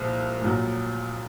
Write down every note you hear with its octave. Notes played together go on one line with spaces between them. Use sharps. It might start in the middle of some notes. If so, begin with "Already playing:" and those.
Already playing: C2 A#2 F3 G#3
A#1 A#2 F#3